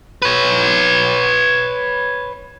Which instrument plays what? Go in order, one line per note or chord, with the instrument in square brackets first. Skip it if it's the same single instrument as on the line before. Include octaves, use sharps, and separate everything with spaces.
[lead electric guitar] B4 C#5